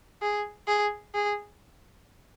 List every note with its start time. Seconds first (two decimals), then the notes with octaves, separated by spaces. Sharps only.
0.22 G#4
0.68 G#4
1.14 G#4